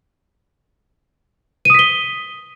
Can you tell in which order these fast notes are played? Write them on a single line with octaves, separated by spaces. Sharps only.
D#7 D#6 B6 G7